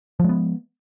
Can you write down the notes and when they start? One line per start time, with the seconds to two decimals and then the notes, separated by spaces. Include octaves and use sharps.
0.20 F3
0.24 G#3
0.29 B3